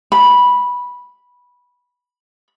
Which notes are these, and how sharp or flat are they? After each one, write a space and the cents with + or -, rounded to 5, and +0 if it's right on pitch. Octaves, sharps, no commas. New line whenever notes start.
B5 -10